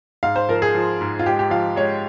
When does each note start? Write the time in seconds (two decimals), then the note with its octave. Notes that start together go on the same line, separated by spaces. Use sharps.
0.23 G#2 F5
0.36 C5
0.49 F3 A#4
0.62 G#4
0.75 F3
1.01 G#2
1.19 F4
1.26 G#3 G4
1.39 G4
1.51 F3 F5
1.76 G#3 C#5